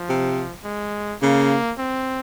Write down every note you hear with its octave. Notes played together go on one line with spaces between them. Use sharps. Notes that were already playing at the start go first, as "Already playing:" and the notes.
Already playing: F3
C3
G#3
C#3 A#3
C4